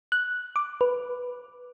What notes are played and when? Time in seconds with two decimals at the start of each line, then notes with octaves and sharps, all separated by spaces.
0.12 F#6
0.56 D6
0.81 B4